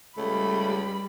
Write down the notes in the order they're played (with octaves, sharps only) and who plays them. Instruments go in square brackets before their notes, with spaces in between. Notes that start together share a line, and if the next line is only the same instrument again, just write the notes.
[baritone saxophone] C#2 [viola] G3 B5 [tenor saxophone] A3